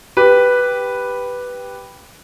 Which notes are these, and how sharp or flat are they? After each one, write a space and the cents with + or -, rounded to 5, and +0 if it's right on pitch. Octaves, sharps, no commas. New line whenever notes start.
G4 +0 B4 +0